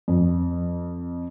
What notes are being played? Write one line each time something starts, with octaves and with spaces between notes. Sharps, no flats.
F2